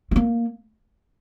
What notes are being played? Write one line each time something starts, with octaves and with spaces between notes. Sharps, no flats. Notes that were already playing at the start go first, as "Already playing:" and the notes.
A3
A#3